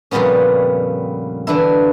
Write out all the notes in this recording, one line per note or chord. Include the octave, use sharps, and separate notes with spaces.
F2 A#2 C#3 G3 B3 C#4
D3 E3 D4 E4